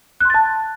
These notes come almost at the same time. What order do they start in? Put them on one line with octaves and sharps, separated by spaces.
F#6 C6 A6 A5